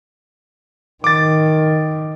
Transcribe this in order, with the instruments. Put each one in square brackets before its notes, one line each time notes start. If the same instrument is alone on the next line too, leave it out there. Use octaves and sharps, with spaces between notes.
[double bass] D#3 [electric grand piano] D6 A6